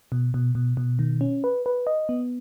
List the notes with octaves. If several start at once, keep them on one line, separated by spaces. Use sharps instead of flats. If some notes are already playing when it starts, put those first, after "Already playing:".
B2
B2
B2
B2
D#3
C#4
B4
B4
D#5
B3